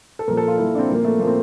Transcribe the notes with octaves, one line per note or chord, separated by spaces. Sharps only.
A4
A#2 F3 A#4
A4
F4
A#2 F3 E4
D4
C4
A#2 F3 A#3
A3
A#2 F3 A#3 C4